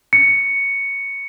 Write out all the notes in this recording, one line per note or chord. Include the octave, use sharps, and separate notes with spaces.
C#7